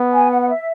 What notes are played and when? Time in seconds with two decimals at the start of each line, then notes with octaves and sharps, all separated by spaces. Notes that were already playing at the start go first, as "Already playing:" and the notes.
Already playing: B3
0.13 G#5
0.30 F#5
0.42 F#5
0.48 E5